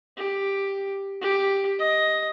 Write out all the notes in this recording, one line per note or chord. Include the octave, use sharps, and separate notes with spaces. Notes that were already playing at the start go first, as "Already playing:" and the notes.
G4
G4
D#5